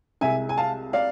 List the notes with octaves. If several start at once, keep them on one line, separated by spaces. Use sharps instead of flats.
C2 C3 G#3 E5 G#5
G#5
F5 A5
D5 F5